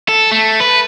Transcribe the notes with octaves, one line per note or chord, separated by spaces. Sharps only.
A4
A3
B4